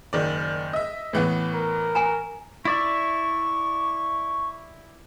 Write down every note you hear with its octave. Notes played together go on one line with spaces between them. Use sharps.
F#1 D#3 D5
D#5 E5
A2 E3 B3
A#4
G#5 A#5
E4 D5 E5 C#6